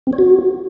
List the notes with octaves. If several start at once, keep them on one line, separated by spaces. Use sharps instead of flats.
C4
C#5
F#4